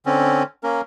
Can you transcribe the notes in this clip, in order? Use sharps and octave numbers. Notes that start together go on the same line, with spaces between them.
D3 C4 C#4
A#3 C#4 A#4